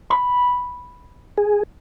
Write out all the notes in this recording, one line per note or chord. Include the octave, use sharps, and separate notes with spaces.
B5
G#4